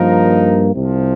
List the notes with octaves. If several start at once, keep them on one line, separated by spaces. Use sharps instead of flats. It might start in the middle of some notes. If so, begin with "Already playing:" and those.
Already playing: G2 F3 A#3 D#4 A#4
C2 C3 F3